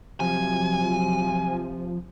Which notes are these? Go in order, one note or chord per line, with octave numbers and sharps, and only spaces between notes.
C3 F3 F#3 G#5